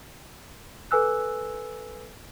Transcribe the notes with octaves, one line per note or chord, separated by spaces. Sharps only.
A4 B4 G#5 E6 F#6